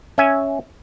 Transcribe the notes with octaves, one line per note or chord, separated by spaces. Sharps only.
C#4 E5 G#5